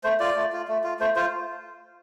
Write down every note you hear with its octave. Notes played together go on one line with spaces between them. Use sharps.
A3 C5
F4 D5
A3
F4
A3
F4
A3 C5
F4 C5